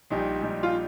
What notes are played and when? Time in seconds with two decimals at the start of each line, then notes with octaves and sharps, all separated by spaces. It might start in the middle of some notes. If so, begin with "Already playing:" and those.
0.10 A#1 A#2 G3 D#4 G4
0.42 A#1 A#2 G3 D#4 G4
0.63 F4